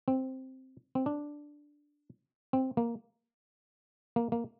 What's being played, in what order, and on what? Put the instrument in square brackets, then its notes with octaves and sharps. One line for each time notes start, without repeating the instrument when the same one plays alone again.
[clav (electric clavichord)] C4
C4
D4
C4
A#3
A#3
A#3